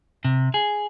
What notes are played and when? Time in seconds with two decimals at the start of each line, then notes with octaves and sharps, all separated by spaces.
0.25 C3
0.54 G#4